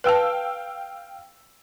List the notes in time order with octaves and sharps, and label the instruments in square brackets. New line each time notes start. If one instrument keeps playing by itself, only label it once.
[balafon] B4 A5 [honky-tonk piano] F5 G5 E6